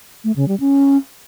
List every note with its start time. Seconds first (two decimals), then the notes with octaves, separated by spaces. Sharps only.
0.24 A3
0.36 C#3
0.48 G3
0.60 C#4